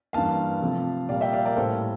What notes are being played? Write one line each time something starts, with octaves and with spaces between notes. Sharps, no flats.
G2 E3 A#3 F5 A5
C3 F3 A3
A#2 G3 A#3 D5 F5
E5 G5
D5 F5
A#4 D5
A2 G3 A#3 A4 C5